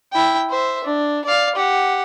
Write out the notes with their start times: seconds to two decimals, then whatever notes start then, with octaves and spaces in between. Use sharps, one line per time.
0.12 E4 G5
0.50 C5 E5
0.85 D4
1.25 D5 F5
1.56 G4 F#5